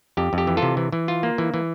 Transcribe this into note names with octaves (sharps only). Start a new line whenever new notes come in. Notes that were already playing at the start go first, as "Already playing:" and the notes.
F2 G4
F2
G4
E3
F4 A4
C3
E3
E3
F4
A#3
E3
E3